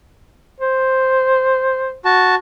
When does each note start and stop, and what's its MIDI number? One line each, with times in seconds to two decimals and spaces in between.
0.60 1.96 72
2.05 2.35 66
2.05 2.35 81